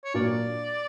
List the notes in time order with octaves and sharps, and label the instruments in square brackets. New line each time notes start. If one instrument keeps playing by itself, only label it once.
[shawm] C#5
[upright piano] A#2 F#3 A#3 D4 [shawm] D5